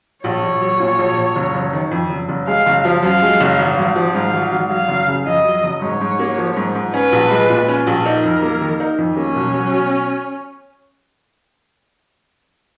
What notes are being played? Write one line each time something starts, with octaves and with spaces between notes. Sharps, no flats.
A#1 C#5
A#1
F#3
A#2
A#1
A#1
F#1
F#1
D#3
F2
F#1
F#1
G#3 F5
F#1
F3
F#2 F5
G#3
F#1
G#1
G#1
F3
G#2 F5
G#1
G#1
F#3 F5
F#1
C#3
F2 D#5
F#3
F#1
G#2 C#5
G#2
A#3
F3
G#2
G#2
C#4 B4
A#1
G#3
A#2
C#4
A#1
D#4 A#4
F2
A#3
D#3
D#4
F2
A#3 C#4
B1
F#3
B2